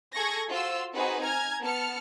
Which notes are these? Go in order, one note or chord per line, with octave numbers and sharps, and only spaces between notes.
G#4 A4 C#6 G#6 A#6
F4 F#4 C5 C6 E6
C4 D#4 F#4 G#4 B4 C5
G#5 A#5 F6 G#6
B3 A5 F6 C#7